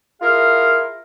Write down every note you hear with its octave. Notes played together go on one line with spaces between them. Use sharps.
E4 F4 G#4 A#4 F5